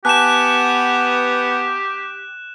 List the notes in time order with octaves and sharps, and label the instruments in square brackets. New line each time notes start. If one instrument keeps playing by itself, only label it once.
[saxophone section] B3 [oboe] G4 [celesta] G#5 A5 [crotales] F#6 E7